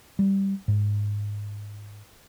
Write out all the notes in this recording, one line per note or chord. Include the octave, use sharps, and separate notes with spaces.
G3
G#2